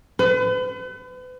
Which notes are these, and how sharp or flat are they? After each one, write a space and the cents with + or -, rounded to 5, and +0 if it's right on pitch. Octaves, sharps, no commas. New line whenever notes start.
B4 +40